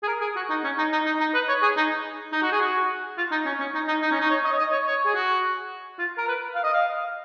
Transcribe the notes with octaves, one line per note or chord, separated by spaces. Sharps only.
G#4
A#4
G#4
F#4
D#4
C#4
D#4
D#4
D#4
D#4
B4
C#5
G#4
D#4
D#4
F#4
G#4
F#4
F4
D#4
C#4
C#4
D#4
D#4
D#4
C#4
D#4
C#5
D#5
C#5
D#5
C#5
C#5
G#4
F#4
F4
A#4
B4
F5
D#5
F5